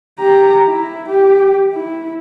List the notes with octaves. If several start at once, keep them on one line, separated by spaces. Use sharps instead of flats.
G4 A#5
E4
G4
E4